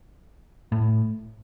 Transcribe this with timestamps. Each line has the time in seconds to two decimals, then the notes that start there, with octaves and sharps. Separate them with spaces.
0.72 A2